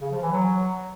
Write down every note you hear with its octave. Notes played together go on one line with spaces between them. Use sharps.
C#3
F3
E3
F#3